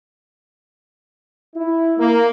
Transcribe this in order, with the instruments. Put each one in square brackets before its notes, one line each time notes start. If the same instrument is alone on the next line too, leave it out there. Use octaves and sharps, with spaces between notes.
[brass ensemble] E4
A#3